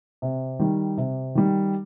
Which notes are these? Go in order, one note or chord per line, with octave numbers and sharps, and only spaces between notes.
C3
D#3 G3
C3
D#3 G3